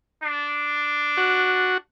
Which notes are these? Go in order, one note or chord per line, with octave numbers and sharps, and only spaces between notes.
D4
F#4